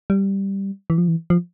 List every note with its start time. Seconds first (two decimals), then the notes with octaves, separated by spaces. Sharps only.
0.10 G3
0.90 E3
0.98 F3
1.08 E3
1.30 F3